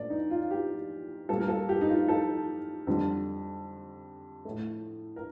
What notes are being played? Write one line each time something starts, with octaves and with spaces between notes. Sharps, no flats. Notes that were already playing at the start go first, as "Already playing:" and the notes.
Already playing: A#2 A3 D5
D#4
F4
G4
A#2 G3 A#3 A4
A#4
A4
G4
D#4
F4
A4
F2 D3 G3
A2 A3
A#4